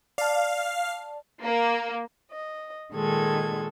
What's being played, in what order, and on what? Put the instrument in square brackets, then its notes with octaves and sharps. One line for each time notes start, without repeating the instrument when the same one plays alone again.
[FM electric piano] D5 A5 [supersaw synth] F5
[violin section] A#3
[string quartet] D#5
A#2 D#3 G#3 A4 G#6